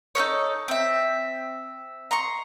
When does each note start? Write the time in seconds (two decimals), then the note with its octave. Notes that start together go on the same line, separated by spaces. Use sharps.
0.15 D#4 A4 A#4 C#5
0.68 C4 E5
2.11 A#5 C6 C#6